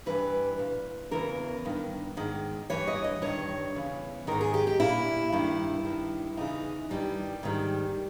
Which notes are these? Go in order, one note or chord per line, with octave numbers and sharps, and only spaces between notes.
G2 E3 B4
A#2
E2 C#3 E3 A#4
G2 D#3
G#2 D#3
G2 E3 C#5
D#5
D#5
G2 D#3 C#5
E2 C#3 E3
G#2 D#3 A#4
G#4
G4
G4
A#2 E4
G2 D#3
G2 D#3
E2 C#3 E3 D#4
G2 D#3 G3
G#2 D#3